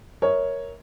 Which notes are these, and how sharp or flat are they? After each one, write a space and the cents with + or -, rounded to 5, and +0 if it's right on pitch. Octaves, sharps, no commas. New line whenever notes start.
A#4 +5 C#5 +0 E5 -40